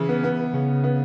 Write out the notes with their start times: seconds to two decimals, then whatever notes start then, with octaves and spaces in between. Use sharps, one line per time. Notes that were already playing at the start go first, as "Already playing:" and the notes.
Already playing: C#3 E3
0.09 B3
0.24 B3
0.54 C#3
0.84 B3